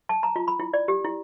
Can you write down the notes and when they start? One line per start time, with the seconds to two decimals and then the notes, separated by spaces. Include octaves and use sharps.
0.09 A5
0.23 A#5
0.36 F4
0.48 B5
0.60 E4
0.73 D5
0.88 G4
1.05 E4